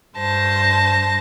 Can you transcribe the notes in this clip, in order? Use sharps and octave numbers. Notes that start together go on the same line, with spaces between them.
G2 C5 A5 A#6